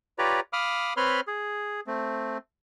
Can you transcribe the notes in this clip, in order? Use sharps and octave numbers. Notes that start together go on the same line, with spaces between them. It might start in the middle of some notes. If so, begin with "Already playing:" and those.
F4 G4 B4 C#5 D5 A#5
F5 B5 D6 D#6 F6
C4 B4 C#5 B5 C6 F6
G#4
A3 C4